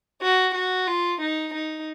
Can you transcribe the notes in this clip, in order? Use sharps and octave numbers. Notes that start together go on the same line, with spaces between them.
F#4
F#4
F4
D#4
D#4